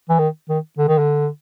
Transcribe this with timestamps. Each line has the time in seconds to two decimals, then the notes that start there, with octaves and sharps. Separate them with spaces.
0.09 E3
0.19 D#3
0.49 D#3
0.78 D3
0.88 D#3
0.98 D3